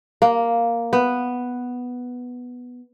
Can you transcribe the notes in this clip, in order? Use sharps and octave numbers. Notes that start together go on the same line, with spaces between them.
A#3
B3